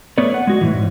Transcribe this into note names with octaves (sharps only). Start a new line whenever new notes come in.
A3 B3 B4 C#5 D5
F#5
G#3 F#4
A2 E3
G#2